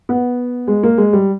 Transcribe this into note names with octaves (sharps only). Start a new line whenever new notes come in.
B3
G#3
A#3
G#3
G3